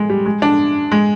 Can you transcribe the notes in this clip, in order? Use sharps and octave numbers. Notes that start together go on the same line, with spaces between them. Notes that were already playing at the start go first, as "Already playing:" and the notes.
Already playing: G#3
G3
G#3
D4
G#3